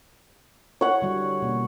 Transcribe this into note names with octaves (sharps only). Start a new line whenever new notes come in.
E4 C#5 F#5
D3 G3 F#4
B2 A#3 C#4